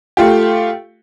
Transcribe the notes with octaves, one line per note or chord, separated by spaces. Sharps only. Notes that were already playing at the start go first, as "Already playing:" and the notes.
A3 F4 G4